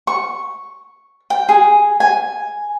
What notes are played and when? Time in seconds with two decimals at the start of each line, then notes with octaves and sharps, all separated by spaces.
0.07 C#6
1.30 G5
1.49 G#4
2.00 G#5